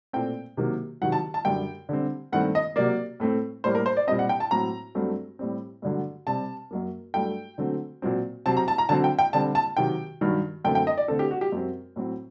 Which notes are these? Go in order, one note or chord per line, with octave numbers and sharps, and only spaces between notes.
A#2 A3 C4 G5
C3 D#3 F#3 A#3
C3 D#3 F#3 F#5
A5
A5
F#2 D3 G3 G5
D3 G3 C4
G2 D#3 A3 C4 F#5
D#5
C3 F#3 A#3 D5
A2 A3 C4
A2 G3 A#3 C5
A#4
C5
D5
A#2 G3 C4 D#5
F#5
G5
A5
A2 F#3 C4 A#5
G2 F#3 A3 C4
A2 G3 C4
G2 D3 F#3 A3
C3 G3 C4 A5
F#2 F#3 A#3
G2 F#3 A3 G5
D3 F#3 A3 C4
A#2 F#3 C4
C3 F#3 C4 A5
A#5
A5
A#5
D3 F#3 C4 A5
G5
G5
D3 G3 C4 A5
A5
C3 D#3 F#3 G5
G2 D#3 F#3
F#2 D3 A3 C4 G5
G5
D#5
D5
D3 A3 C4 A4
G4
F#4
G4
F#2 F#3 C4
A2 F#3 C4